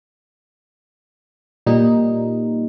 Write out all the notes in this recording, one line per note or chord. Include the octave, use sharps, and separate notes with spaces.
A#2 G3 D#4